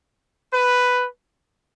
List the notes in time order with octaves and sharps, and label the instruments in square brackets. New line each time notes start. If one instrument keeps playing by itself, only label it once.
[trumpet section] B4